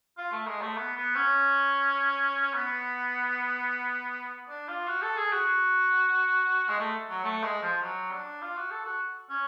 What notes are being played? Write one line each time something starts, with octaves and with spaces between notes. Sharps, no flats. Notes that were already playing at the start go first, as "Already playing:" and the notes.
F4
A3
G#3
A3
B3
B3
C#4
B3
D4
F4
F#4
A4
G#4
F#4
G#3
A3
F#3
A3
G#3
F3
F#3
D4
F4
F#4
A4
F#4
C#4